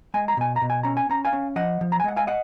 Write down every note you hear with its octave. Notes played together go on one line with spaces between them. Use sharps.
G#3 G#5
A#5
B2 G#5
A#5
B2
G#5
C#4 A#5
G#5
C#4 A#5
F5 G#5
C#4
F3 D#5 F#5
F3
A#5
G#5
G#3 F#5
F5 G#5
D#5 F#5